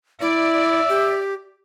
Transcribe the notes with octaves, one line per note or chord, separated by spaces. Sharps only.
E4 D5 E5
G4